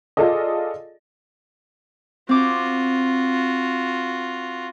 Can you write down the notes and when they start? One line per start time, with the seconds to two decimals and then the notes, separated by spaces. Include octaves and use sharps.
0.17 F4 G#4 A4 D5 D#5
2.29 C4 F4 F#4 D6